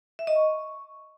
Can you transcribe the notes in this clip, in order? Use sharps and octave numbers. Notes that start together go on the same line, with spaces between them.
E5
D#5
C#6